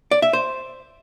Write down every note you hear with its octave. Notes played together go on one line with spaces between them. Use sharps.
D5
E5
C5